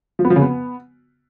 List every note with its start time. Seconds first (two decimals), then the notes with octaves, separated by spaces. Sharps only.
0.19 F3
0.25 B3
0.30 F3
0.36 C#3
0.42 B3